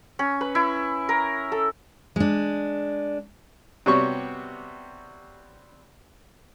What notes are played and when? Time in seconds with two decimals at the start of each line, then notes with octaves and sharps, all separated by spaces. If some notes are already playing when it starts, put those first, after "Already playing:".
0.19 C#4
0.41 B4
0.55 E4
1.09 A#4
1.52 A4
2.16 G#3 D4
3.86 C3 G3 B3 F#4 C#5 C#6